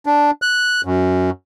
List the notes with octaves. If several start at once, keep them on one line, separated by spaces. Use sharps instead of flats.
D4
F#6
F#2